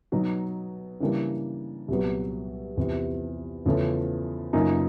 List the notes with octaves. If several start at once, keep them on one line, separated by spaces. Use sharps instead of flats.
B2 F#3 B3 D#4
C#3 E3 G3 A#3 D4
C2 A#2 F#3 B3
E2 C3 F3
E2 C#3 F3 A3 C#4
F#2 C#3 F3 A#3 D#4